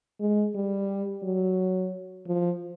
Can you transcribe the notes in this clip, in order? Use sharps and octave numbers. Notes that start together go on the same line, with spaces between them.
G#3
G3
F#3
F3